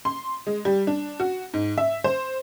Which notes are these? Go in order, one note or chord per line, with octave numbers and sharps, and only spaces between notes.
C6
G#3
G3
D4
F#4
G#2
E5
C5